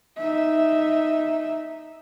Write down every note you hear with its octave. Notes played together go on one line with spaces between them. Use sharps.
D#4 E5